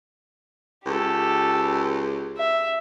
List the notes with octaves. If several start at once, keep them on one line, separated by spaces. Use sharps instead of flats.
C#2 G4 A4
E5